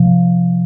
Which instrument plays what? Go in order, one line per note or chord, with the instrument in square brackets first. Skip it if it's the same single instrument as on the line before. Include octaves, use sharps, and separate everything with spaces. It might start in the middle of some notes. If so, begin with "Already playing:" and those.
Already playing: [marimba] C3 F3